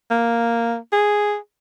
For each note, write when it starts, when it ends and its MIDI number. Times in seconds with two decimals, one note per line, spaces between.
0.11 0.76 58
0.92 1.36 68